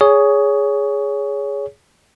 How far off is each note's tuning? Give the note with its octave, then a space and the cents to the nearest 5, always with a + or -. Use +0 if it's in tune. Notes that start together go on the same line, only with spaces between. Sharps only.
G#4 +0 C#5 +20